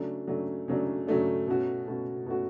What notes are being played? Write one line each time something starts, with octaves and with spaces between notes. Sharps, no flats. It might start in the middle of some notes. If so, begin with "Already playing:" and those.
Already playing: C#3 F#3 A3 D4
C#3 F#3 A3 D4
C#3 F#3 A3 D4
C#3 F#3 A3 D4
B2 A3 C#4 F#4
B2 A3 C#4 F#4
B2 A3 C#4 F#4